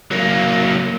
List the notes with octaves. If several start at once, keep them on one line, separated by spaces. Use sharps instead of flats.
F#3 A#3